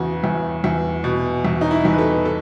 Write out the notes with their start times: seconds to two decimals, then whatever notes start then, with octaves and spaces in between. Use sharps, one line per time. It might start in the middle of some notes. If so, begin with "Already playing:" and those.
Already playing: E2 C#3 F#4
0.24 E2
0.64 E2
1.04 B2
1.45 E2
1.61 D#4
1.71 E4
1.85 E2
1.93 B4
1.98 A4
2.25 A4